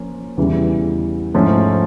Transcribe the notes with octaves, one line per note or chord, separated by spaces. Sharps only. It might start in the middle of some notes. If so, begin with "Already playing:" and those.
Already playing: F3 A#3 C#4
E2 C#3 E3 G3
G#2 F3 A3 C#4